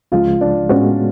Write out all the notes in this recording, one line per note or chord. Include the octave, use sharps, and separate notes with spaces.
C#2 C#3 F3 G#3 F4
D4
A2 G#3 B3 C#4 F#4